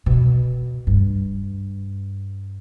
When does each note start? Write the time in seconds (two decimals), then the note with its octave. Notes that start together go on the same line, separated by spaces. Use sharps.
0.06 B2
0.87 G2